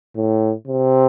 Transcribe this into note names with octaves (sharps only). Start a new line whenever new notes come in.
A2
C3